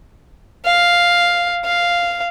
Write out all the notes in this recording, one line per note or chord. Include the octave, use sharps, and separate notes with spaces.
F5
F5